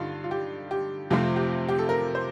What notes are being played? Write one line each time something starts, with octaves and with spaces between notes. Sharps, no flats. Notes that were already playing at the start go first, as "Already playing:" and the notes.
Already playing: G2 D3 G3 D#4 F4
F4
G4
G4
F2 C3 F3 A3 C4 F4
G4
G4
A4
A#4
C5